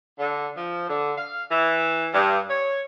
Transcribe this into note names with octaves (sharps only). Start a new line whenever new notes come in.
D3
F3
D3
F5
E3
G2
C#5